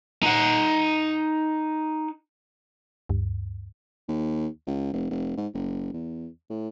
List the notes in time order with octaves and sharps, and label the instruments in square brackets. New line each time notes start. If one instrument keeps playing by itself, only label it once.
[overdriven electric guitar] D#4 F#5
[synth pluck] D2 G2
[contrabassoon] D#2
C#2
F1
F1
G#2
F#1
E2
A2